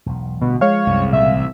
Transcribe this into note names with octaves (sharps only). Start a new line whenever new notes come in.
E1 B1
A1 B2 D3 G3
F3 G#3 C#5 F5
C2 F#2
A#2 C#3 F3 E5
A1 C3